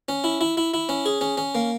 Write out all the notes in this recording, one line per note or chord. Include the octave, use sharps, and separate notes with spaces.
C#4
E4
E4
E4
E4
C#4
G#4
C#4
C#4
A#3